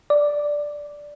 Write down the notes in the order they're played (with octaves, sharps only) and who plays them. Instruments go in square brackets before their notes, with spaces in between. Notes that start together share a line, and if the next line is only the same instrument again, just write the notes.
[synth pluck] D5